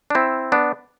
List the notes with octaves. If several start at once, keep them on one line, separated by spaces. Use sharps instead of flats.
D4
C4 E4
B3 D4